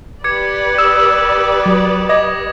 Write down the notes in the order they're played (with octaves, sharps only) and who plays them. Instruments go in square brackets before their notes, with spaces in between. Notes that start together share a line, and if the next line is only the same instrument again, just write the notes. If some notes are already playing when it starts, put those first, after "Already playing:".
[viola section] G4 B4 D5 [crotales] D6 G#6 C#7
[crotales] D#6 E7 [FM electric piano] E6
[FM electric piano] F#3 [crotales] D6 D#6
[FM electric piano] D#5 [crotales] D6 G#6 A#6